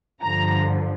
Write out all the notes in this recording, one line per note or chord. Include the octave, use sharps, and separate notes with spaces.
G2 D3 F3 A#5